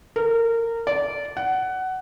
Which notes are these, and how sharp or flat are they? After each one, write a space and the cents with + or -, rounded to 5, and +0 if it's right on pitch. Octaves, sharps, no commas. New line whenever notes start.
A#4 -20
D5 -20
F#5 +15